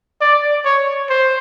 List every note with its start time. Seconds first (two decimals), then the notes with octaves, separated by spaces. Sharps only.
0.21 D5
0.65 C#5
1.09 C5